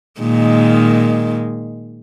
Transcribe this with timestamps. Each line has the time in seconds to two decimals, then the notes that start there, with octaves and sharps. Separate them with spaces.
0.20 A#2 D#3 G#3